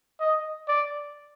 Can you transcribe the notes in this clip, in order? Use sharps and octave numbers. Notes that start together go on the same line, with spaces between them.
D#5
D5